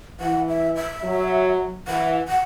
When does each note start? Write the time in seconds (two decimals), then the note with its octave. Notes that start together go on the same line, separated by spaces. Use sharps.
0.20 E3 F#5
0.49 E5
0.76 E5
1.04 F#3
1.87 E3 F#5
2.28 F#5